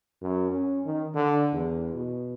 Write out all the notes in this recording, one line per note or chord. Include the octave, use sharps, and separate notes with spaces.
F#2
C#4
D#3
D3
E2
B2